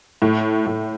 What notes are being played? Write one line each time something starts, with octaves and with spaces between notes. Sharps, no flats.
A2
A2